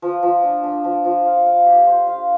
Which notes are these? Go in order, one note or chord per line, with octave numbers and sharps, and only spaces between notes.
F3
F3
D4
D4
F3
F3
F5
F5
G4
C5
F5